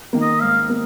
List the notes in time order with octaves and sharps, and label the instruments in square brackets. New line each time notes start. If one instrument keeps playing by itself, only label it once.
[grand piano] D#3 A#3
[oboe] D#5
[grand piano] G#2 [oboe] F5
[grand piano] A#3